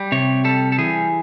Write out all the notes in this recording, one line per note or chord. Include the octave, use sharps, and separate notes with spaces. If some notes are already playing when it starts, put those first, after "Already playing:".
Already playing: G3
C3 C#5
G3 A4
A4
E3 G#4